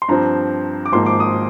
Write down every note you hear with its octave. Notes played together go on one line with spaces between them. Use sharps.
C6
G2 F3 C4 A#5
D6
G#1 G#2 F3 A#3 C6
D6
D#6